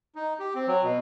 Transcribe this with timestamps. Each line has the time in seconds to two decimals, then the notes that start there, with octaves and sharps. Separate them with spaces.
0.15 D#4
0.40 G4
0.55 C4
0.67 F#3
0.83 B2